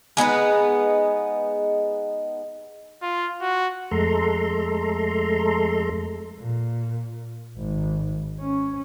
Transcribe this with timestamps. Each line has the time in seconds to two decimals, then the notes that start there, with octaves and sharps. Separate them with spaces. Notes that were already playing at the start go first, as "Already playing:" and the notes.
0.17 G#3 B3 D#4 B4
3.02 F4
3.41 F#4
3.91 F2 G#3 A3 A4 A#5 C6
6.40 A#2
7.57 G#1
8.40 C#4